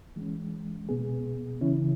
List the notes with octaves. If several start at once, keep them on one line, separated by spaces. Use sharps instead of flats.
E3 G#3 C#4
B2 B3 G#4
C#3 E3 C#4 E4